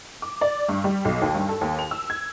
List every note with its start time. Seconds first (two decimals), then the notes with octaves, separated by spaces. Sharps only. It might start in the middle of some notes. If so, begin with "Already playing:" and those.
0.22 D6
0.41 D5
0.69 G2
0.84 G3
1.05 B1
1.22 D#2
1.35 G2
1.49 A4
1.61 D#2
1.79 F7
1.91 E6
2.10 G#6